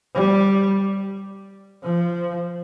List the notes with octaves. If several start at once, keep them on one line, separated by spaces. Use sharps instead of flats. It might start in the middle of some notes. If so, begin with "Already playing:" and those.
G3
F3